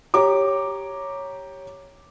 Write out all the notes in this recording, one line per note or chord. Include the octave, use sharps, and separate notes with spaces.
G4 C#5 A#5 D6